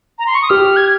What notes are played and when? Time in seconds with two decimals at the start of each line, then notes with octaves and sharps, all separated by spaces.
0.19 A#5
0.27 C6
0.35 C#6
0.42 D#6
0.50 G4 F6
0.76 G#6